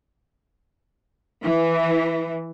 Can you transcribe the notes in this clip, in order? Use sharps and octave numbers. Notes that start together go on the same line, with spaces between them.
E3